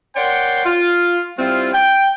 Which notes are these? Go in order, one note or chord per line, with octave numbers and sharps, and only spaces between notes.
A#4 C#5 D5 F#5 G5 C6
F4
G3 C4 E4 F4
G5